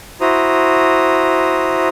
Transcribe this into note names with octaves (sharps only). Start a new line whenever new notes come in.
E4 F#4 C5 A#5 D#6